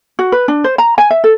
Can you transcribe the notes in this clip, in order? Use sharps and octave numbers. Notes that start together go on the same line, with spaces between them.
F#4
B4
D4
C5
A#5
G#5
E5
A4